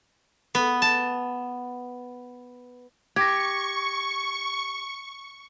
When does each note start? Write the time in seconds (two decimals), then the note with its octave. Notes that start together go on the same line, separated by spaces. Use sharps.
0.55 B3
0.82 A5
3.16 G4 C#6 G#6 A#6